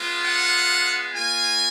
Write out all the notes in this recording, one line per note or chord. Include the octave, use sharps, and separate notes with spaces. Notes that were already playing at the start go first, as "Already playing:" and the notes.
Already playing: G#3 B3 F4
F#5
A#3 F4 G#5